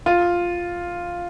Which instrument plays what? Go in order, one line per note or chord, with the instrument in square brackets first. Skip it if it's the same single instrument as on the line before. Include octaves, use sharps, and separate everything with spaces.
[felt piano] F4